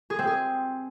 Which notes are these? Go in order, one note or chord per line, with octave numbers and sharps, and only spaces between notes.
G#4
C4
G#4